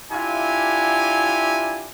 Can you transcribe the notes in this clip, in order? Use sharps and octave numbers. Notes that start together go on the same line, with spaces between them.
D4 E4 F4 G4 E5 G#5